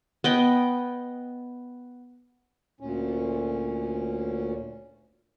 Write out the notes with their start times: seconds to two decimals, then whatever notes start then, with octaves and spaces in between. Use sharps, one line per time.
0.24 B3 D#5 G5
2.80 D2 A#2 C#4